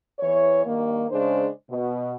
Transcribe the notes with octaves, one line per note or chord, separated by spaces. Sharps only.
E2 E3 C#5
G2 D#3 A#3
C#3 G#3 D4 C5
B2